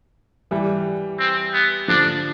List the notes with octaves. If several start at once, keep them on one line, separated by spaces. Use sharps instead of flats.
E3 G3
C4
B3
D3 F3 D4